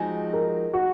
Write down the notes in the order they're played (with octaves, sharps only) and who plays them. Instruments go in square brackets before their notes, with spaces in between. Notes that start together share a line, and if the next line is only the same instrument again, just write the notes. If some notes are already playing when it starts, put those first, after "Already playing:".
Already playing: [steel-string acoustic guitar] F3 G#3 C4 D#4 F#4 [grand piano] G#5
[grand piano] A#4
F#4